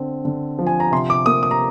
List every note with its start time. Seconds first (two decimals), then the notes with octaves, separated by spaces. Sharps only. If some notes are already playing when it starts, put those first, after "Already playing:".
Already playing: D3 C4
0.25 D3
0.59 F3
0.67 G#5
0.80 A#5
0.92 C3 C6
1.10 D6
1.26 A#3 D#6
1.43 D#6
1.51 A#5